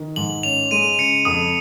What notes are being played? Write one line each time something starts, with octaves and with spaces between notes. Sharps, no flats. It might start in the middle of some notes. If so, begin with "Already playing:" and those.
Already playing: D#3
G#2 F#7
C#4 F7
G#3 D#7
C#3 C#7
F2 D#6